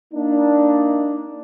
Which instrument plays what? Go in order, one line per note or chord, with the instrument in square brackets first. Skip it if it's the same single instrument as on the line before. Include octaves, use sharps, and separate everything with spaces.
[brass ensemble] A#3 D4 D#4